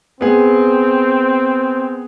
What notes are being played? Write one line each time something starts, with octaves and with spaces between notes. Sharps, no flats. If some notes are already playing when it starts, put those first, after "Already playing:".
B3 C4 G#4